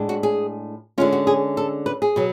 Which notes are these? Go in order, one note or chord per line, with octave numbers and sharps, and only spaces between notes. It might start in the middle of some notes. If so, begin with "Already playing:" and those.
Already playing: A2 G#3 D4
F#4
G#4
D3 G#3 C#4 F4
F#4
G#4
A4
B4
G#4
B2 F#3